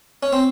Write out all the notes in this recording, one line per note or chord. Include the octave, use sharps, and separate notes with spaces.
C#4
C4